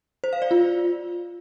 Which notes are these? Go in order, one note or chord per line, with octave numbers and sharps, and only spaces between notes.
C5
F5
D5
F4